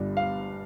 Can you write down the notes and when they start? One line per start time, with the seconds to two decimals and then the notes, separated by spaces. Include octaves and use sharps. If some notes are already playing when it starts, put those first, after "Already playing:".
Already playing: G1 G2 G3
0.17 F5